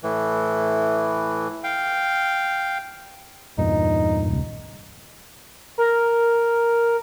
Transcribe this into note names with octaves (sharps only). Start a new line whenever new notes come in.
A2 E3
F5 G5
E2 G2 A#2 D#4
D#1 C#2
A#4